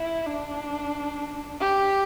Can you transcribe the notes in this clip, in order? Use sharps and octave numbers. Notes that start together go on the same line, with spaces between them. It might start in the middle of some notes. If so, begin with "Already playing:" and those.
Already playing: E4
D4
G4